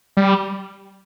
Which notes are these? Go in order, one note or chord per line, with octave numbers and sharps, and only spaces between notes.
G3